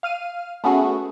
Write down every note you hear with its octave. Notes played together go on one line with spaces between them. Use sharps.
F5 F6 D#7
A3 B3 C#4 F#4 G#4